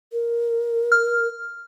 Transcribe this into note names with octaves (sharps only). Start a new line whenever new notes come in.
A#4
F6